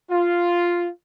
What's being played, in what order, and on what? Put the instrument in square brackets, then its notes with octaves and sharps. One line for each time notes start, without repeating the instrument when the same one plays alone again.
[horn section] F4